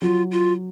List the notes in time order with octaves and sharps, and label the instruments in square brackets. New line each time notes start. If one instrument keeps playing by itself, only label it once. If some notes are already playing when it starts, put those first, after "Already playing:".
[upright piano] F#3 [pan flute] F4
[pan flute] F4